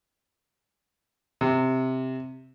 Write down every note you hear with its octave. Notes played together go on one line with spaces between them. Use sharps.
C3